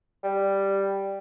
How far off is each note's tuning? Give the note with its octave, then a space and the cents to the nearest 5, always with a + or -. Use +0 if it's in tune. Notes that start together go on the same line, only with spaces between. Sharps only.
G3 +0